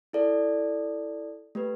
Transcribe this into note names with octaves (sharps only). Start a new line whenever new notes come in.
E4 A4 D5
A3 G4 B4